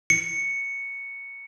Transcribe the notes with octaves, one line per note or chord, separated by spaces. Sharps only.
C#7